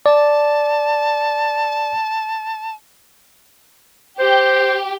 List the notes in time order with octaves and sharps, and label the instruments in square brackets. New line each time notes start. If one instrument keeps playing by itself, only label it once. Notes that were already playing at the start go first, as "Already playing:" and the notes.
[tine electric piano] D5 [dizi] A5
[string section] G4 [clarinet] C5